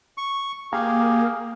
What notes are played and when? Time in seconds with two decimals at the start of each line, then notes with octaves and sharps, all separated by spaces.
0.18 C#6
0.73 A#3 G4 G#4 F5